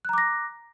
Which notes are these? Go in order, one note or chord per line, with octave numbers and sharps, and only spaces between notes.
A#5 D6 F#6 A#6